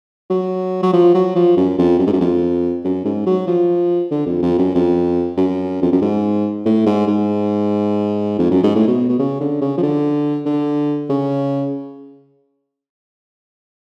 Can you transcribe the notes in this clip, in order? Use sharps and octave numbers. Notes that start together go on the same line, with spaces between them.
F#3
F#3
F3
F#3
F3
F#2
F2
F#2
G#2
F#2
F2
F#2
G#2
F#3
F3
D3
F2
F2
F#2
F2
F#2
F2
F#2
G#2
A2
G#2
G#2
F2
F#2
G#2
A2
B2
B2
C#3
D3
C#3
F3
D3
D3
C#3